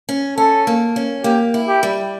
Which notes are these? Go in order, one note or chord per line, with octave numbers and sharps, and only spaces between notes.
C#4
C#4 A4
A#3
C#4
A#3 G4
E4
G4
G3